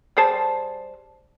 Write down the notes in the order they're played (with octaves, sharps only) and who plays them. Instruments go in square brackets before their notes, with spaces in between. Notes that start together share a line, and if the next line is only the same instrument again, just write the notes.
[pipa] G3 G#4 C5 A5